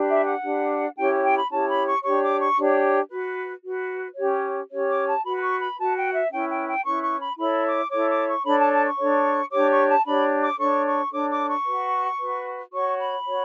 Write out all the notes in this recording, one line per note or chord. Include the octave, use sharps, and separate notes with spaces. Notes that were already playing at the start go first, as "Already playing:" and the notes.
Already playing: D4 G4 B4
E5
F#5
D4 G4 B4
C#4 E4 G4 C#5 G5
G5
B5
C#4 E4 G4 C#5 A5
B5
C#6
D4 G4 C#5 C#6
D6
C#6
D4 G4 C#5
F#4 B4
F#4 B4
C#4 G4 C#5
C#4 G4 C#5
D6
A5
F#4 B4 B5
B5
C#6
B5
F#4 B4 A5
G5
E5
C#4 E4 B4 G5
G5
G5
C#4 E4 B4 C#6
C#6
B5
E4 A4 C#5 B5
D6
E4 A4 C#5 D6
D6
C#6
D4 A4 C#5 B5
A5
A5
C#6
D4 A4 C#5
D4 G4 C#5 D6
C#6
A5
D4 G4 C#5 B5
D6
D4 A4 C#5 C#6
C#6
D4 A4 C#5 D6
D6
C#6
F#4 B4
F#4 B4
F#4 C#5 C#6
B5
F#4 C#5